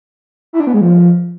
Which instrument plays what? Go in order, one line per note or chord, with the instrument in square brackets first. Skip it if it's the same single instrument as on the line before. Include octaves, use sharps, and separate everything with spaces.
[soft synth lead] E4
D4
B3
G#3
F3